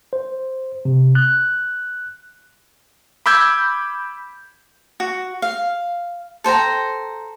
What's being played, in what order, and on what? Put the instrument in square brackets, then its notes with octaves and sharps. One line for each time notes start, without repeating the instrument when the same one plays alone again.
[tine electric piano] C5
C3
F#6
[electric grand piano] B5 D6 E6 G6 G#6
[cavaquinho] F#4
F5
A4 C5 G5 A#5